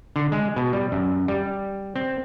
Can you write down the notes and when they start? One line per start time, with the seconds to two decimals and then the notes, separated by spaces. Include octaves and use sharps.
0.16 D3
0.32 G#3
0.56 B2
0.73 G3
0.92 F#2
1.28 G3
1.96 C4